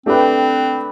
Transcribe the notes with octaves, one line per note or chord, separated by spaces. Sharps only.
A3 C4 D4 G4 B4